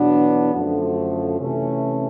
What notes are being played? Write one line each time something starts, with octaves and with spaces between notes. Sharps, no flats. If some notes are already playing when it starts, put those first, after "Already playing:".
Already playing: E2 B2 F#3 B3 D4
F#2 D3 F3 A3
C3 E3 A3 C#4